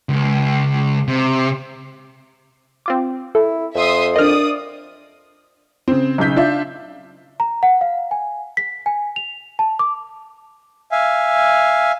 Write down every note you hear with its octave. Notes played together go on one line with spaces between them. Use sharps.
C#2
C3
C4 F4 D6
E4 A4
F2 E5 C6 D#6
D4 A#4 D5 D#5 D#6 F6
C#3 C4
B1 C#3 G6 B6
D4 F4 E5
A#5
F#5
F5
G#5
B6
G#5
F7
A5
D6
E5 F5 G#5